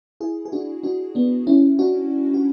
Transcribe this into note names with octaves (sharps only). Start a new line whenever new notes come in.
E4 G#4
G#4
D4 F#4
D4 F#4
B3 D4
C#4 E4
D4 F#4
F#4